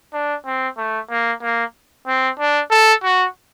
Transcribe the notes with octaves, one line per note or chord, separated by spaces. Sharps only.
D4
C4
A3
A#3
A#3
C4
D4
A4
F#4